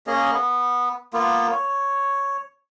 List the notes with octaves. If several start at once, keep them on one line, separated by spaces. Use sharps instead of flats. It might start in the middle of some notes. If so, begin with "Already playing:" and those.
A#3 C#4 G#4 D#5
B3
A#3 B3 F4
C#5